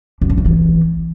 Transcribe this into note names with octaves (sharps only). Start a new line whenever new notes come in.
F#2
D3
F2
E3